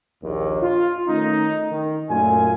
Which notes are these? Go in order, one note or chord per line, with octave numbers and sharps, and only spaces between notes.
A#1 D#2
F4
D#3 A3 C#4 D#4
D#3
F#2 A#2 A3 F4 G#5